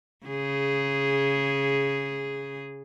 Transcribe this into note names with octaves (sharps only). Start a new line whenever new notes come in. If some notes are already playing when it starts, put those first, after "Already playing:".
C#3 G#4